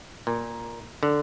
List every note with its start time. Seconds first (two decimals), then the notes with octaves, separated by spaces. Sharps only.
0.27 A#2
1.03 D3